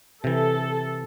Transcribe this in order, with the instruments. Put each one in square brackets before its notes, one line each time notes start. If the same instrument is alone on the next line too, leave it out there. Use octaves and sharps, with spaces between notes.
[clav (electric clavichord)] C3 E3 [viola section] A4